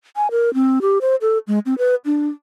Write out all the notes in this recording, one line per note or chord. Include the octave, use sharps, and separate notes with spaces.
G#5
A#4
C4
G4
C5
A4
G#3
C4
B4
D4